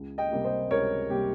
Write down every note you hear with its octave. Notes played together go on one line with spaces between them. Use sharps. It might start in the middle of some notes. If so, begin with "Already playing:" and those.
Already playing: C#2
D#5 G5
C3 G3 A#3
C5 D#5
C#2 A#4 C#5
C3 G3 A#3 G4